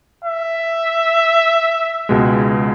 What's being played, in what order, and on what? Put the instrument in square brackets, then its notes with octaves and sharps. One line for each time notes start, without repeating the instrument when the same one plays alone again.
[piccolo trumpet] E5
[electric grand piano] C#2 B2 G#3